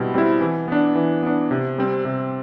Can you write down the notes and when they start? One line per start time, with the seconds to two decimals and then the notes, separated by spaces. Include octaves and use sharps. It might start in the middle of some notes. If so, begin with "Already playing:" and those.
Already playing: B2 G3 C4 E4
0.14 G3 C4 E4
0.41 E3
0.68 B3 D4
0.95 E3
1.23 B3 D4
1.51 C3
1.78 G3 C4
2.05 C3